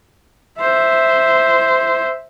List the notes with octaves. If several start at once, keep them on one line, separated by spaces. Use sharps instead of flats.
C5 E5